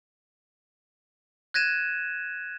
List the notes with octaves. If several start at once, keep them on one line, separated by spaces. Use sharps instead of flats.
F#6 G#6 A#6 D#7 E7